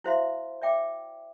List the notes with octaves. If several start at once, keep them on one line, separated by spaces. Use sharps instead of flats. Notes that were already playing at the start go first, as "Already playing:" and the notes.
E4 F#4 C5 E5 F5 C6
D5 E5 G5 D6